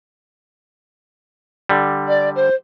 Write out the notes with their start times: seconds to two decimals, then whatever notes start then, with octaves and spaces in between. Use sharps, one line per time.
1.69 D3 G3
2.07 D5
2.35 C5